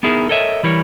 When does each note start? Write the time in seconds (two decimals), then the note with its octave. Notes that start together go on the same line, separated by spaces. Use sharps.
0.03 B3 D#4 E4 G#4 A#4
0.29 A4 A#4 C#5 D#5 E5
0.63 E3 G3 E4 A#4 C#5